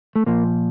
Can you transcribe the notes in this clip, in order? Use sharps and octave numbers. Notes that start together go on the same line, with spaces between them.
A3
A#2 F3 A#3